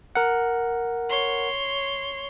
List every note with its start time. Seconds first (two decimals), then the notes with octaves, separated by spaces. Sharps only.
0.15 A#4 F#5
1.10 C#5 C6